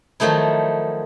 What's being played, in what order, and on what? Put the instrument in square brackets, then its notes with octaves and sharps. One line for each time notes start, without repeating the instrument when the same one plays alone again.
[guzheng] D#3 F3 F#3 A3 D#4 E4